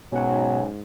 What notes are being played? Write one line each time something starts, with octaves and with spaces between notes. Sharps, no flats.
B1 G#2 B2 F#3 C#4 F#5